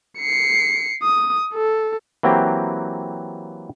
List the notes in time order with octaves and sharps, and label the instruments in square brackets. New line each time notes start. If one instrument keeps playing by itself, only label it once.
[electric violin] C7 C#7
D#6
A4
[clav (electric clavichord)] E3 F#3 A#3 C4 G4